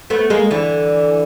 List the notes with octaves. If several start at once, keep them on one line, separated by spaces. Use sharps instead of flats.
A3 B3
G#3 A#3
D3 E3